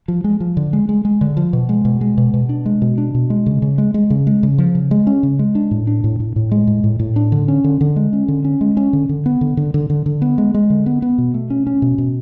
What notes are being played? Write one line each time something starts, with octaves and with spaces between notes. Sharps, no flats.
F3
G#3
F3
D3
G#3
G#3
G#3
D3
F3
B2
G#3
B2
G#3
B2
B2
D4
G#3
B2
D4
B2
G#3
C#3
C#3
G#3
G#3
C#3
G#3
C#3
F3
C#3
G#3
C#4
C#3
G#3
D4
A2
D4
A2
A2
A2
G#3
A2
A2
A2
D4
D3
C#4
D3
D3
G#3
C#4
D3
C#4
G#3
C#4
D3
D3
B3
D3
D3
D3
D3
D3
B3
G#3
G#3
D3
B3
B3
B2
A3
C#4
C#4
B2
B2